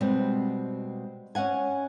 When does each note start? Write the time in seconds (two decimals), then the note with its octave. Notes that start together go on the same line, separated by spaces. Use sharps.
0.01 B2 G3 G#3 B3 C4
1.35 C#4 D#5 F#5 G#5